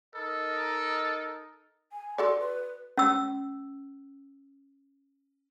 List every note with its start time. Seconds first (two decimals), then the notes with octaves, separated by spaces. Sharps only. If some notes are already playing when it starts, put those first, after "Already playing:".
0.15 D#4 A4 A#4 D#5
1.92 G#5
2.18 F#4 A4 D5 C6
2.40 B4
2.97 C#4 E6